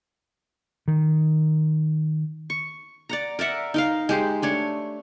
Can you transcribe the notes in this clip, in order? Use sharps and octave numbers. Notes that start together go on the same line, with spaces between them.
D#3
C#6
D5 F#5 A#5
A#4 D5 E5 F#5
D#4 A#4 F5
G#3 G4 C5
A3 D4 C#5